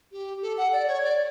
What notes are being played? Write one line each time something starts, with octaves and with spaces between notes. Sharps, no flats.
G4
A4
F#5
D5
C#5
D5